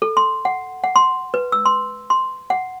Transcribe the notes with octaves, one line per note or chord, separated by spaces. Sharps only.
A4
C6
F#5
F#5
C6
B4
E6
C6
C6
F#5